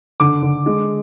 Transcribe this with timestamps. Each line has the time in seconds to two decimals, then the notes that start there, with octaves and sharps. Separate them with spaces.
0.20 D3 D6
0.42 D3
0.66 G#3